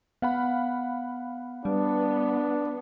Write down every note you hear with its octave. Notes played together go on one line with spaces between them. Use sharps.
B3 F5 F#5 B5
G3 B3 D4